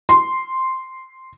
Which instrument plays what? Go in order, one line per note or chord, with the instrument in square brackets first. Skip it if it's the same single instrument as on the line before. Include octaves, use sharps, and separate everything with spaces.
[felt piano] C6